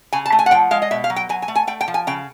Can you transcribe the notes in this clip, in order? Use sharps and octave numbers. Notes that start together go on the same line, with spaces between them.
C#3 G#5
A5
A3
G#5
F#5
F3 G5
G#3 F5
D#5
B2 E5
F5
F#3
G5
F#3 G#5
G#5
A3
G#5
A3 G5
G5
F3
G#5
C#3 G5